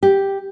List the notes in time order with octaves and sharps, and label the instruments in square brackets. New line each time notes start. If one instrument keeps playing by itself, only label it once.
[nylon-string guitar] G4